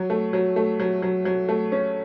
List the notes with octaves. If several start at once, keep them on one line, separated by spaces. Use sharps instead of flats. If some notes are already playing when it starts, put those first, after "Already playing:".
Already playing: F#3
A3
F#3
A3
F#3
F#3
F#3
A3
C#4